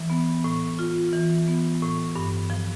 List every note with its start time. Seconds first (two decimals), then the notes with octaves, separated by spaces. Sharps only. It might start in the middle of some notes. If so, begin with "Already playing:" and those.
Already playing: E3
0.10 B3
0.44 A2
0.79 F4
1.13 E3
1.48 B3
1.82 A2
2.16 G2
2.50 F3